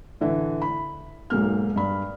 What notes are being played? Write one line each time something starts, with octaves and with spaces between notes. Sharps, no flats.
A2 D3 E3
B5
B1 G#2 A#3 F6
G2 B5